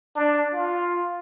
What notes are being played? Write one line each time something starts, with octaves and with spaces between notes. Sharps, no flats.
D4
F4